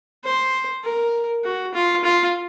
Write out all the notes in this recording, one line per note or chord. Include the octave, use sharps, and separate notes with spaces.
C5
A#4
F#4
F4
F4